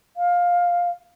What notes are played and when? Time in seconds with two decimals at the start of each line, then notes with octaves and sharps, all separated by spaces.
0.17 F5